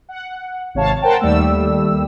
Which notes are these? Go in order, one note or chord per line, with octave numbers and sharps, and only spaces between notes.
F#5
G#1 C3 C#5 F5 A5
A#4 C5 F#5 G5 A5
D#2 G3 A3 E6